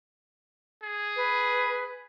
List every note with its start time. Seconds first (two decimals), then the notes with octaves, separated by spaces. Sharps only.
0.83 G#4
1.16 B4